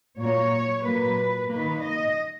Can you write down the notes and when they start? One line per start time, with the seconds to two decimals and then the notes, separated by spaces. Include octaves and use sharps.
0.20 A#2 F#3 A#3 C#5
0.85 A#2 F#3 A#3 B4
1.50 D#3 A#3 B4
1.82 D#5